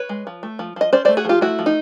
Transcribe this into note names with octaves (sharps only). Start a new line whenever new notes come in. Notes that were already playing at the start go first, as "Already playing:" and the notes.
Already playing: B4 C#5
G#3
F3
A3
F3
F3 D#5
C#4 C5 D5
A3 C5 D5
F#4 G#4
F3 F4 G4
A3 E4 F#4
F3
D#4